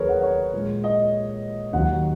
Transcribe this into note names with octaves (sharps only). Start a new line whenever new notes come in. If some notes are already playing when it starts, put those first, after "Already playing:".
Already playing: D#2 D#3 F#3 G#4 A#4 B4 C#5
F#5
C#5
A#2 G#3
D#5
D#2 D#3 F#3 F#5